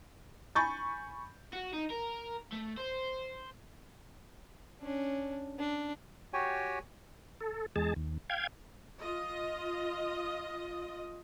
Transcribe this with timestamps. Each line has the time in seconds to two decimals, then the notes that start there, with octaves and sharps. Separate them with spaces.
0.55 G#5 B5 C#6 G6 A6
1.53 F#4
1.73 D#4
1.90 A#4
2.53 A3
2.77 C5
4.81 C#4 D4
5.59 D4
6.33 F#4 G4 C#5 G5 G#5
7.41 A4
7.76 E2 G#3 G#4 A5
7.96 D#2
8.30 F5 G5 G#6
9.01 F4 D#5